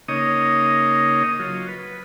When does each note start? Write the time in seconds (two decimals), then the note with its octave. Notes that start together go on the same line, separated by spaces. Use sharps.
0.08 C#3 A#3 D#4 C#5 D#5 D#6
1.40 F#3 F4
1.68 B4